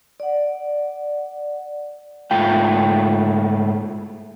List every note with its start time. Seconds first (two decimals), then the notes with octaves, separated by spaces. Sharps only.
0.20 D5 F#5
2.31 G#2 A3 F4 G5